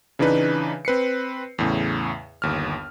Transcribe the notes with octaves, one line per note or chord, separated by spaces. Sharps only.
C#3 E3 D4 D#4 B4
C4 B4 C7 C#7
E2 A2 C#3
G1 D#2 F6